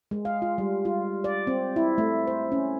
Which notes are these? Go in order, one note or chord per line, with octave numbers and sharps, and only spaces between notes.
G#3
F5
F4
G3
F4
D5
C4
E4
A3
C5
C#4